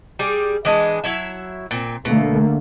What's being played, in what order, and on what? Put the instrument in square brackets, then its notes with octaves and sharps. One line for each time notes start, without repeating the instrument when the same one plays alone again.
[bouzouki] G3 G#4
E3 G#3 D4
F#3 E4 E5
A#2 C4
[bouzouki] B2 [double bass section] D3 A3 A#3